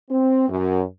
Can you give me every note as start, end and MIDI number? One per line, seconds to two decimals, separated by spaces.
0.10 0.48 60
0.49 0.82 42